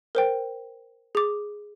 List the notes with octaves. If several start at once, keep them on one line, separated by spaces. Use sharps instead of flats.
A#4 C5 G5
G#4 D6